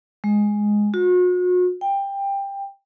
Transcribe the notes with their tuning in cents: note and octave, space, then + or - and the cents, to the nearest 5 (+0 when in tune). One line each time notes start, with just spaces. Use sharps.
G#3 +0
F#4 -40
G5 +15